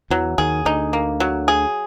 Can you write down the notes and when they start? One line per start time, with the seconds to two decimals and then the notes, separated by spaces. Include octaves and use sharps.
0.10 E2 E3 F#3
0.38 D#2 D#3 G#4
0.65 D2 D3 D#4
0.93 A#3
1.20 F#3
1.48 G#4